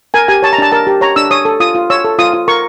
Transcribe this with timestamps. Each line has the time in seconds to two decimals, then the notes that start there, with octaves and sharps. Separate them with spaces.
0.14 A#4 G#5
0.28 G4 G#5
0.43 C#5 A5
0.53 A#5
0.58 D4 A5
0.72 A#4 A5
0.87 G4
1.01 C#5 A#5
1.16 D4 E6
1.31 C#5 D#6
1.45 A4
1.60 F4 D#6
1.75 F4
1.90 C#5 E6
2.05 A4
2.18 F4 D#6
2.34 F4
2.48 A#4 C#6